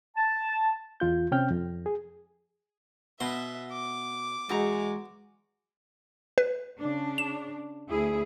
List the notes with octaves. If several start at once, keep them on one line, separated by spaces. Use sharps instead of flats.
A5
E2 F4 G6
C3 C4 C#4 G5 F6 G6
F2
G#4
B2 B3 E5 C6
D6
E2 G#3 F#4 A#5
B4
C#3 D4
E7
D2 E4 G#4